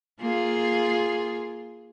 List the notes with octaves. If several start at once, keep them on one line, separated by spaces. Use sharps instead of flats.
A#3 F4 G#4